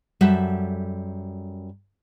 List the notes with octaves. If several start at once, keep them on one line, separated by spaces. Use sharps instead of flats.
F#2 G3 F#4 A4 E5